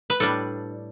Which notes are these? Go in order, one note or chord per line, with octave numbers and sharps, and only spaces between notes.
B4
A2 G3 D4 A4